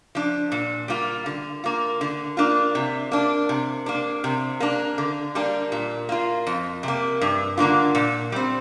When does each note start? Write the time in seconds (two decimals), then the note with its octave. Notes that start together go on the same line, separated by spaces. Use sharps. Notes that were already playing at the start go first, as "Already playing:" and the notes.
0.15 F3 D4
0.52 A#2
0.88 G3 A#3 F4
1.26 D3
1.64 A#3 F4
2.01 D3
2.37 A#3 D4 F4
2.75 C3
3.11 A#3 D4
3.49 C3
3.86 A#3 D4
4.24 C3
4.60 A#3 D4
4.98 D3
5.35 G3 A#3 D4
5.72 A#2
6.09 A#3 F4
6.47 F2
6.83 C3 A#3
7.21 G2
7.57 D3 A#3 D4 F4
7.95 A#2
8.32 G3 C4